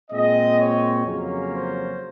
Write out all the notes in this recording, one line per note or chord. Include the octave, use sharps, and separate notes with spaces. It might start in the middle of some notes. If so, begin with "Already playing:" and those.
A#2 G#3 C4 D#5
C#5
F2 C#3 F#3 A#3 C#4 C#5
C5